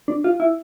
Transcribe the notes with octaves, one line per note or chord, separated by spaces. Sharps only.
D4
F4
E4